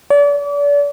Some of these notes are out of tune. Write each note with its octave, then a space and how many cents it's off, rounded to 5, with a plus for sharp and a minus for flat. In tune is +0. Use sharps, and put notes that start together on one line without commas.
D5 -35